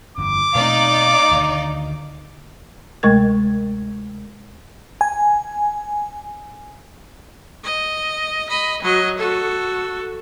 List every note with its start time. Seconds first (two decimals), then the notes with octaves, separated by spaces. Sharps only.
0.18 G1 F2 D6
0.55 B2 A3 C4 D#4 D5 F5
1.31 D2 D3 D#3
3.03 D2 C3 G#3 A3 A#4 G#6
5.01 G#5
7.64 D#5
8.49 D#5 B5
8.82 F#3 D#5
9.18 F#4 A4